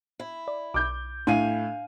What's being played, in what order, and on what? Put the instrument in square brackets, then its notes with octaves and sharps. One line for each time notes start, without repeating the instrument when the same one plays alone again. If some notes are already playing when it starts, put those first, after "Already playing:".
[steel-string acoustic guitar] E4
[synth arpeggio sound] D5
[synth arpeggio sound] B1 [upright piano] D6 G6
[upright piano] A2 D#7 [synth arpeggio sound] D4 [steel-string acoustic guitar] F5 G#5